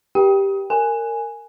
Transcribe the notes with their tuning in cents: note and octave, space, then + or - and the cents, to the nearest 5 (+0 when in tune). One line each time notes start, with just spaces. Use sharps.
G4 +0 G5 +0
A#4 -20 G#5 +0